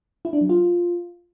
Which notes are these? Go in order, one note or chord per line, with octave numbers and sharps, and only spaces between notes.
E4
D4
F#3
F4